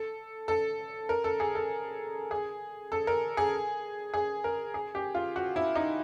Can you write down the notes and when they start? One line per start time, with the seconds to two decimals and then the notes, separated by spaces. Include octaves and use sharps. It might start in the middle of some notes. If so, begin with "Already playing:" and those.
Already playing: A4
0.48 A4
1.09 A#4
1.24 A4
1.40 G#4
1.55 A4
2.31 G#4
2.92 A4
3.07 A#4
3.37 G#4
4.14 G#4
4.44 A#4
4.74 G#4
4.95 G4
5.15 F4
5.36 F#4
5.56 E4
5.75 D#4